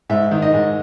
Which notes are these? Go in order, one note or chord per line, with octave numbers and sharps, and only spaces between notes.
G#2 E5
D#3
D#5
G#2